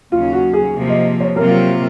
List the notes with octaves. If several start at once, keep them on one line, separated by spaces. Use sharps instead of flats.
D#2 C#3 F#3 C#4 F4
F#4
G#4
C3 F3 A#3
D#5
C#5
C3 F#3 A#3 F4 A#4